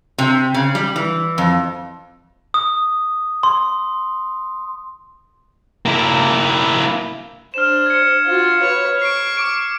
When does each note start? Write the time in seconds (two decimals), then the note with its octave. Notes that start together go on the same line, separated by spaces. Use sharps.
0.18 C3
0.54 C#3
0.75 G3
0.96 E3
1.38 F2
2.54 D#6
3.43 C6
5.86 A#3 E4
7.54 D4 C5 F6 E7
7.86 G#6 C#7
8.26 F4 F#4
8.62 B4 C#5
9.02 C#6 C7 D7
9.37 D6 D7